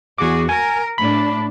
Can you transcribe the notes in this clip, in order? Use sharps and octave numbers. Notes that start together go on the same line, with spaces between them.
E2 F#4 G#4 D6
A#4 G#5
A2 D4 B5